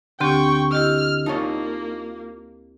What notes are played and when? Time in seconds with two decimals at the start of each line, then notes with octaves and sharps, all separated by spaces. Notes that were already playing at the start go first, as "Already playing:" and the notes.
0.20 D2 D3 C4 G4 G5 C#6
0.73 E4 G4 D#5 F6
1.26 A#3 D#4 F4 C#5 A5